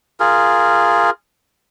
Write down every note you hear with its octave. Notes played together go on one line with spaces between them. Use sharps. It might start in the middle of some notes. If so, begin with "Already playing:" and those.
F4 G#4 A#4